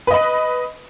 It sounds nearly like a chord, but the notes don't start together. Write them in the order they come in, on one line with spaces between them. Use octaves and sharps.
B4 D#5 B5